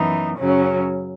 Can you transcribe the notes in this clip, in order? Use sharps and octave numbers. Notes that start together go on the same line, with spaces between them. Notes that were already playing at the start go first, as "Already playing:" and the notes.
Already playing: F#2 E3 B3 D#4
F#2 C#3 F#3 C#4